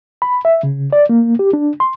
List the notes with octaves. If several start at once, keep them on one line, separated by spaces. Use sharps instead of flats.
B5
E5
C#3
D5
A#3
G4
D4
C6